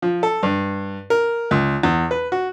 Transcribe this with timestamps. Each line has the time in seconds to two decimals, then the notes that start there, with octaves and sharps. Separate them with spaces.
0.02 F3
0.23 A4
0.43 G2
1.10 A#4
1.51 C#2
1.83 E2
2.11 B4
2.32 F#4